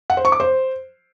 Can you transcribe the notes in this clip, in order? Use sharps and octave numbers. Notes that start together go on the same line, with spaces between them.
F#5
C5
C#6
D6
C5